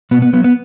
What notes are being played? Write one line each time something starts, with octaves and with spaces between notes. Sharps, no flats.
B2 B3
B3
F#3 B3
B3